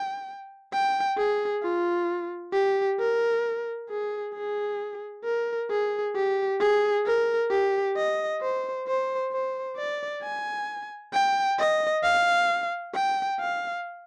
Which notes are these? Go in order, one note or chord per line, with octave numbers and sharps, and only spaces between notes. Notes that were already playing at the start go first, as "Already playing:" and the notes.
Already playing: G5
G5
G#4
F4
G4
A#4
G#4
G#4
A#4
G#4
G4
G#4
A#4
G4
D#5
C5
C5
C5
D5
G#5
G5
D#5
F5
G5
F5